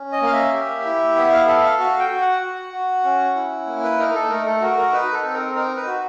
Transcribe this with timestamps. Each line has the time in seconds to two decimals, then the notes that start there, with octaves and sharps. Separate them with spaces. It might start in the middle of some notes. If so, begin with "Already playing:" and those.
Already playing: C#4
0.12 D#5
0.22 A#3 F5
0.33 E5
0.53 G4
0.85 E4
1.16 B3 E5
1.32 F5
1.47 A4 E5
1.64 F5
1.78 F#4 F5
2.00 G5
2.10 F#4
2.21 F#5
2.42 F#4
2.73 F#4
3.04 C#4
3.35 E4
3.67 A#3
3.83 B4
3.99 D#4 A#4
4.09 A#4
4.15 A4
4.30 A3 A#4
4.46 A4
4.61 F#4 A#4
4.77 A#4
4.92 D#4 B4
5.13 A4
5.24 C4
5.34 A#4
5.55 D#4 A#4
5.76 B4
5.87 F#4